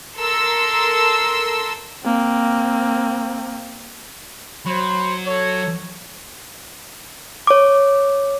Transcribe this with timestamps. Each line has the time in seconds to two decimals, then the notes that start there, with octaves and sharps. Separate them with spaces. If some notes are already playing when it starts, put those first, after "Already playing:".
0.18 A4 A#4 C6 E6
2.04 A#3 C4
4.66 F#3 C5 B5 C6
5.27 A4 C#5
7.47 C#5 D6